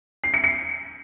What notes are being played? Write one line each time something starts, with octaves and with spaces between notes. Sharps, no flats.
C7
C#7
C#7